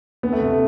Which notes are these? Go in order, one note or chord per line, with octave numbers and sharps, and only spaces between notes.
D2 B3
A3
C3
A3